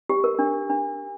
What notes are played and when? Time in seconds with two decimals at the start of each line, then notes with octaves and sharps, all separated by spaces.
0.09 G4
0.24 A#4
0.39 D4
0.70 D4